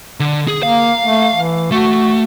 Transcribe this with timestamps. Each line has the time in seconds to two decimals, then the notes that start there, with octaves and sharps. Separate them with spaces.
0.20 D3
0.48 G#4
0.63 A#3 F5
1.04 A3
1.35 E3
1.72 A3 F#4